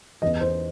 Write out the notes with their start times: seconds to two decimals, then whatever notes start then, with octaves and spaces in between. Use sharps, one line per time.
0.22 E2 D#5
0.41 C5